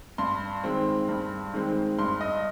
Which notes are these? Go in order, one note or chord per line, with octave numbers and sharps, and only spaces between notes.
G2 C6
D#3 G#3 C4
G2
D#3 G#3 C4
G2 C6
D#5